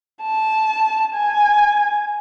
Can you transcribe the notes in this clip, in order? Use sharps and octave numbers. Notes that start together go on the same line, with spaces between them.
A5
G#5